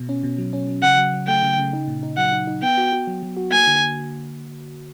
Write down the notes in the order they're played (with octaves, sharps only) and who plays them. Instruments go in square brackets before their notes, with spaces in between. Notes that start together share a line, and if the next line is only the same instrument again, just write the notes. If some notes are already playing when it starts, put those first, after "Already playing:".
Already playing: [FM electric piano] B2
C#4
B2
F#3
C#4
F#3
[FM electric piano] C#3 [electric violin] F#5
[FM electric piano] F#3
F#3
[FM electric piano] A3 [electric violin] G5
[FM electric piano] C#3
C#3
D#4
A#2
D#4
[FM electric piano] F#3 [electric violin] F#5
[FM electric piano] D#4
D#4
[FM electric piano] B3 [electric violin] G5
[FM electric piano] F#4
F#4
F#3
F#3
F#4
[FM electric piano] A#3 [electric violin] G#5
[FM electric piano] D3